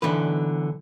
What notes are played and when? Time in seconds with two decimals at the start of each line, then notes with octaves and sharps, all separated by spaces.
0.02 B1 D3 E3 B4